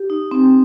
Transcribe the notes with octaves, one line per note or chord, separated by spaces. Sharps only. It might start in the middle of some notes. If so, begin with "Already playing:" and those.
Already playing: G4
D#4
C4